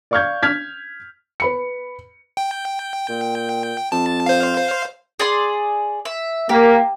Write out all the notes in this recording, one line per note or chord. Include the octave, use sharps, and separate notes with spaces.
D5 F5 C#6 F6 G6 G#6
F6 G#6 B6
B4 B5 C#7
G5
A#2
F2 A5
C5 F5
G#4 D5 C6
E5
A#3 G4